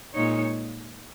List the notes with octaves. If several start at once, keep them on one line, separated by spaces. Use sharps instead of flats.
A#2 G#3 D#4 C#5